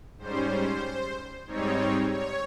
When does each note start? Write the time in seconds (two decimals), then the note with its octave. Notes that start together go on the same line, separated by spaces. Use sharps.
0.19 G#2 G3 C#4 C5
1.47 G#2 G3 C4 D#4 C#5
2.12 C#5